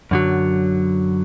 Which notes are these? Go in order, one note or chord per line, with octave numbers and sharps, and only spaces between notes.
F#2 D3 F#3